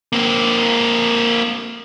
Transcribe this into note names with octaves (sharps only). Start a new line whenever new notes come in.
A#3 C4